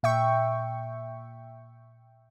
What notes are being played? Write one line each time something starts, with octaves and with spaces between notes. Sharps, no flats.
A#2 E5 G5 C#6